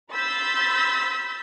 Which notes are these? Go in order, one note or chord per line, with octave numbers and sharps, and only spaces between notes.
B5 C6 E6 G6 A6 B6